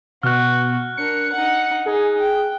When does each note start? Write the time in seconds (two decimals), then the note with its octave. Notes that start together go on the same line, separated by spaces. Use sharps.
0.23 B2 F#4 F6 F#6
0.97 D4 A#4 C#7
1.32 D#4 F#5
1.86 D#4 G#4
2.19 G5